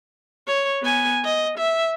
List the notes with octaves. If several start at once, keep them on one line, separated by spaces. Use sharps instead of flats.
C#5
B3 G#5
D#5
E5